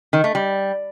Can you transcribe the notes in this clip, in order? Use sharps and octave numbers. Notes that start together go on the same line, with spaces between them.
D#3
A3
G3